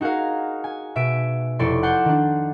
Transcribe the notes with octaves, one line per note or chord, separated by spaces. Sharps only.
D#4 F#4 G#4 A#4 F5
G#5
B2 E5 B6 D7
F1 E4 A4 C#5 D5 C6
F#5 A5 C6 G6
D#3 D4